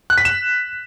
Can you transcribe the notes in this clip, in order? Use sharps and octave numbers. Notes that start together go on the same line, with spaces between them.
F#6
B6
E7